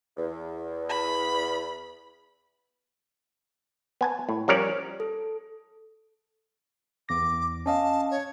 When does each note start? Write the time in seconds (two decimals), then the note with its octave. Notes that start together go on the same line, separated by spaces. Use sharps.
0.17 E2
0.89 B5
4.01 B3 G#5 A5
4.29 A2
4.48 F3 G3 C#4 A#4 C#5 D5
5.00 A4
7.09 E2 D6 A#6
7.66 C#4 D#5 F5 A5
8.10 C#5